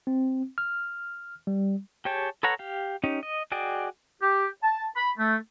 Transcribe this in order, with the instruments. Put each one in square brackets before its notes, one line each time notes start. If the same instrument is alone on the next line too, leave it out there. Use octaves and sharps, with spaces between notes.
[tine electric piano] C4
F6
G3
[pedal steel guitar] G4 G#4 C#5 G5 A5
A4 B4 C#5 F#5 A#5
G4 F5
C#4 D#4 G4
D#5
F#4 G#4 D5 D#5 G5
[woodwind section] G4
A5
B5
A3